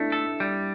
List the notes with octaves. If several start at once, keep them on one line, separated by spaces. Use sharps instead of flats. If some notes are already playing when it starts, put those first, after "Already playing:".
Already playing: A3 D4 E4
A4
G3